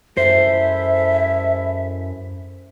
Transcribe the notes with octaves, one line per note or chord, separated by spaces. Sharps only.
F#2 G#3 E4 A4 C5 E5